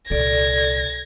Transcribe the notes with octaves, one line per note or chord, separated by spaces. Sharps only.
C2 A#2 A4 D5 G#6 A#6